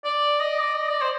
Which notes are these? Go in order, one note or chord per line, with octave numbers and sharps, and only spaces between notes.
D5
D#5
D5
D#5
D5
C5